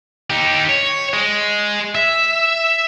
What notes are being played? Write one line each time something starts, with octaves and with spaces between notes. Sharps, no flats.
D#4 G4
C#5
G#3
E5